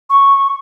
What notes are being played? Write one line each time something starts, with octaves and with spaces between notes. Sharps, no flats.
C#6